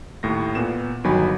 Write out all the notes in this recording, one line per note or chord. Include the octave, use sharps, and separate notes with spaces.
D#2 A2 A#6
A#2 B3 E7
G1 D#3 F#3 G#5 B5